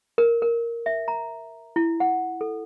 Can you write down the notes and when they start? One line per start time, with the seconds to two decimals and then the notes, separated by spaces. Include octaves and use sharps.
0.18 A#4
0.42 A#4
0.86 E5
1.08 A#5
1.76 E4
2.00 F#5
2.41 A4